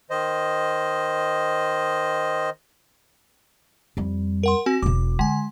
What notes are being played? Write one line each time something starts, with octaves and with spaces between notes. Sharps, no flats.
D#3 C5 D#5
F2 G3
A#4 F#5 C6
C4 F#4 G#5
E1 B2 D6
D3 G#3 G#5